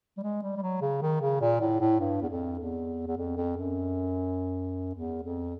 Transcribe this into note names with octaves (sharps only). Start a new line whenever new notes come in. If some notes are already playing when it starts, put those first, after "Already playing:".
G3
G#3
G3
G3
F#3
C#3
D#3
C#3
A#2
A2
A2
G2
E2
F2
E2
E2
F2
F2
F#2
E2
F2